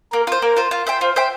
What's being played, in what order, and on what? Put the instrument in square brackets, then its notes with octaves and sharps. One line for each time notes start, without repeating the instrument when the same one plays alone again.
[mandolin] A#3 [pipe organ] A#4
[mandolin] F4 C5
[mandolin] A#3 [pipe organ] A#4
[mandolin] F4 C5
F4
C5 E5 G5
[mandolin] F4 [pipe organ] C5
[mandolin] C5 E5 G5